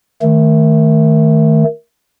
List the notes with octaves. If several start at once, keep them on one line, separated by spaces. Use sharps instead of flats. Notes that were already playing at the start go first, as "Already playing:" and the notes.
D#3 A3